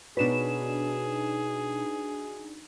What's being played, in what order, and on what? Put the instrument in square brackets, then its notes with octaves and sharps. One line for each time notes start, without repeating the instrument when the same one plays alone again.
[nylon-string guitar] B2 C#5 [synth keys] D4 D#4 F#4 [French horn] G#4 [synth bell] B4 E7